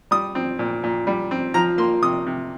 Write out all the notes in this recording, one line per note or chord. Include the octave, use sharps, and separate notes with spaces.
G3 D#6
C4
A#2
A#2
G3
C4
F3 A#5
A#3 C6
C3 D#6
C3